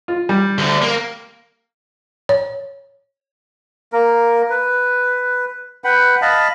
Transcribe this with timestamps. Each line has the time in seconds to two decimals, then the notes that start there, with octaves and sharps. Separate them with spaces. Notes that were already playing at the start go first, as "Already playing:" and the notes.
0.08 F4
0.29 G3
0.58 D2 D3
0.82 A#3
2.29 C#5
3.93 A#3 A#4
4.50 B4
5.84 B4 F#5 G5 B5
6.22 D#5 F5 A5 B5